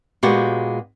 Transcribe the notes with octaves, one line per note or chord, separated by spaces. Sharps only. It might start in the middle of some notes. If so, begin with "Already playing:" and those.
A#2 G#3 A#3 B3 F#4 G4